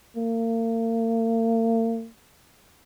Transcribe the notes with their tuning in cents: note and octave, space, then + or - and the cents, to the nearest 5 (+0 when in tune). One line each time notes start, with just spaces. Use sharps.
A#3 -40